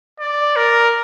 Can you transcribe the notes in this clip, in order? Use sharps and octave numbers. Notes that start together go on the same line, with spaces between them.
D5
A#4